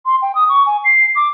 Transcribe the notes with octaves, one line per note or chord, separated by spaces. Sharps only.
C6
G5
D#6
C#6
G#5
C7
D6